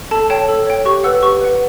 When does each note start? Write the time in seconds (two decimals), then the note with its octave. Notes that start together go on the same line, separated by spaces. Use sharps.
0.11 A4 A5
0.30 C#5 G5 A5
0.49 A4
0.67 C#5 G5
0.85 G4 C#6
1.04 B4 F#5 E6
1.22 G4 C#6
1.41 B4 F#5